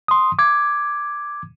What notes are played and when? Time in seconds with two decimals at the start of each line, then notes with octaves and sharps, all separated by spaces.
0.08 C6 D#6
0.39 D6 G#6